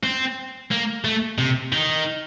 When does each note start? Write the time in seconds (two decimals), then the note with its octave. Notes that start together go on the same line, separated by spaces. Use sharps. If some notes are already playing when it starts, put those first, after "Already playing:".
0.04 C4
0.72 A#3
1.05 A3
1.38 C3
1.72 D#3